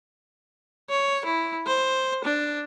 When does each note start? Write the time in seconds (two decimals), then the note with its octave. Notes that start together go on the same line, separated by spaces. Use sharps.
0.90 C#5
1.25 E4
1.67 C5
2.24 D4